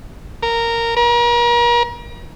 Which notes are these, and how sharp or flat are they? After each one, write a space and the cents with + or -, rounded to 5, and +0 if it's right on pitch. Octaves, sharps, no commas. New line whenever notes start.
A#4 -10
A#4 +40